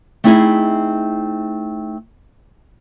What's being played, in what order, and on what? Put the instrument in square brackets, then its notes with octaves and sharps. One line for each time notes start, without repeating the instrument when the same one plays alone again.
[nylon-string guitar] A3 C4 D#4 E4 G#4